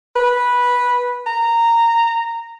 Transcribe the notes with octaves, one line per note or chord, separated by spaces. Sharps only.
B4
A#5